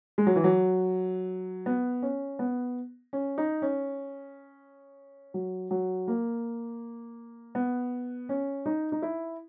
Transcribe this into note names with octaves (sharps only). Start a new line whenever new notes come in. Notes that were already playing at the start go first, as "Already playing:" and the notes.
G#3
F#3
E3
F#3
B3
C#4
B3
C#4
D#4
C#4
F#3
F#3
A#3
B3
C#4
D#4
D#4
E4